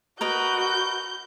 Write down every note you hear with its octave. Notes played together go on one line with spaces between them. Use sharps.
F#4 A#4 B4 D#5 G6